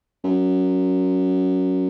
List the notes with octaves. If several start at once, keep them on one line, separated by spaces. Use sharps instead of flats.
F#2